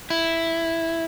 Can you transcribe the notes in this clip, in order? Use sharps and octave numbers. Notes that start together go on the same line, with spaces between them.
E4